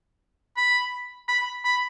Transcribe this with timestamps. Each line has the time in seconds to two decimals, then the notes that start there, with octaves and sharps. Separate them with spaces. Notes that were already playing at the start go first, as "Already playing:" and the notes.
0.57 B5
1.28 B5
1.65 B5